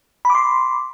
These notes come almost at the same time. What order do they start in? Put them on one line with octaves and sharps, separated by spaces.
B5 D6 C6